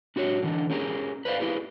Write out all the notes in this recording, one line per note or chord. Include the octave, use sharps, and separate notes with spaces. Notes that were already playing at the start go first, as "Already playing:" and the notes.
D4 F#4 G4 C#5
D3 E3 D4
C#4 G4 G#4 A#4
B4 C5 D5 E5 F5
E4 G4 G#4 B4